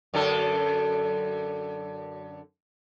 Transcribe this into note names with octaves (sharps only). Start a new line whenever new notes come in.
F#2 D3 A4